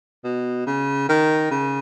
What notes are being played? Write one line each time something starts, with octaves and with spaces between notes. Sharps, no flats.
B2
C#3
D#3
C#3